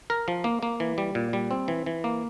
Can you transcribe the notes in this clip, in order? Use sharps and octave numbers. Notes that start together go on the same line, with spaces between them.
A#4
F3
A#3
A#3
E3
G3
A#2
G3
C4
E3
E3
A#3